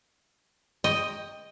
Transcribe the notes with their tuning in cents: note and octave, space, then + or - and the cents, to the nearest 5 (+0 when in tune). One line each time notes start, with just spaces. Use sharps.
D#5 +0 G5 +15